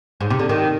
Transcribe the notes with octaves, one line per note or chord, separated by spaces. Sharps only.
G#2
C3
D3
D#3